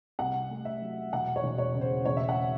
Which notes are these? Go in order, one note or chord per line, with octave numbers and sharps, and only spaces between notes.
C2 F#5
A3
E5
F#3
E1 F#5
C#5
E1
C#5
C#3
C5
E1 C#5
E5
F#5